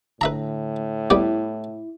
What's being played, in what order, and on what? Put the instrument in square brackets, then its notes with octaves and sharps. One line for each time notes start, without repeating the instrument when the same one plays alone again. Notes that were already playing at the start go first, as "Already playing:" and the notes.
[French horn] A2 [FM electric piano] D3 [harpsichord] B4 E5 A#5
[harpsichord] G3 B3 D5 [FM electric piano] E4